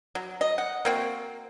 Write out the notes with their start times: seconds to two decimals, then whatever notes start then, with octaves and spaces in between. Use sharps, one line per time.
0.15 F#3
0.41 D#5
0.58 F#5
0.85 A#3 C4 F#4